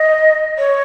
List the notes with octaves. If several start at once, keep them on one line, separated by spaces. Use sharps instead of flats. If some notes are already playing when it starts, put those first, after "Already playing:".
Already playing: D#5
C#5